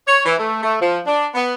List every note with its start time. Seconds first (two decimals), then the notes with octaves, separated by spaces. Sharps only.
0.07 C#5
0.25 E3
0.39 A3
0.63 A3
0.81 F3
1.06 D4
1.35 B3